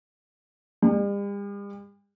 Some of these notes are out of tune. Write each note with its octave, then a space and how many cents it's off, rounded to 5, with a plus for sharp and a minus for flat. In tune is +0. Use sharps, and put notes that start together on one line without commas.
G3 +45